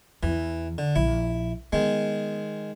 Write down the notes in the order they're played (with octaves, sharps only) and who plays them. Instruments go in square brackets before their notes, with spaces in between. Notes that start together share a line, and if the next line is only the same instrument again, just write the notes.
[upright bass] E2 [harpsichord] E3
[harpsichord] D3
[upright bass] A#1 [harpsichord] E4
[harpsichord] D#3 G#3 [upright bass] B3